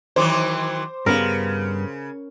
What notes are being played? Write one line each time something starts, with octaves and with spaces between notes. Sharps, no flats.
D#3 E3 F#3 C5 D6
G2 C#3 B3 A#4 F5